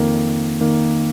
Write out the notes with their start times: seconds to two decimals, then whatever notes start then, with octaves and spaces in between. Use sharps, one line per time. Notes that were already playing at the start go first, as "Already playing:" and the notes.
Already playing: F2 D#3 A#3
0.61 D#3 A#3